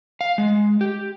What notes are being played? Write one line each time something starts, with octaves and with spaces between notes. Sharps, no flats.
F5
G#3
G4